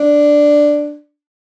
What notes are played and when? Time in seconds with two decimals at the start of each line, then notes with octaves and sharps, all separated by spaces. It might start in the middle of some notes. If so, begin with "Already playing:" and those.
Already playing: D4